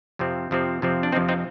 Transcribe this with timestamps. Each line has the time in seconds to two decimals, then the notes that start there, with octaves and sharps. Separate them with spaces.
0.19 F2 C3 F3 C4
0.51 F2 C3 F3 C4
0.82 F2 C3 F3 C4
1.03 D4
1.12 F2 C3 F3 C4 D#4
1.29 C4 D#4